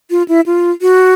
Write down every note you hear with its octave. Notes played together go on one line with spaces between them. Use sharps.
F4
E4
F4
F#4